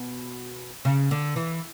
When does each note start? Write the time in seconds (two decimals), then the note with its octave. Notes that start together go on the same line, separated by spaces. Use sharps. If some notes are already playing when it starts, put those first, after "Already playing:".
Already playing: B2
0.85 C#3
1.11 D3
1.36 E3